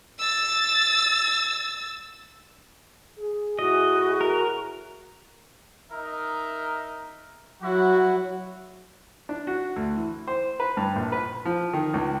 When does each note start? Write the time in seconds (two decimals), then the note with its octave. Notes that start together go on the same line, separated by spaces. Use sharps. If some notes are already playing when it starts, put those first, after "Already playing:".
0.20 E6 A6
3.19 G#4
3.59 A2 E4 F#4 G#4 D#5
4.21 A#4
5.90 D#4 A#4 E5
7.61 F#3 E4 F#4
9.29 D4
9.47 F#4
9.76 D2
9.97 E3
10.27 C5
10.60 B4
10.77 G2
10.96 A#1
11.12 B4
11.45 F3
11.73 D#3
11.94 C#2